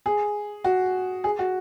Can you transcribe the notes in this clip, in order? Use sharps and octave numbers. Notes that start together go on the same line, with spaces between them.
G#4
F#4
G#4
F#4